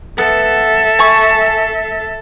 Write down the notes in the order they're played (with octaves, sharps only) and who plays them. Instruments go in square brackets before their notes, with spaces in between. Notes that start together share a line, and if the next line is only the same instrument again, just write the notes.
[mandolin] B3 [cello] A4 E5
[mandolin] G#5 A5 C#6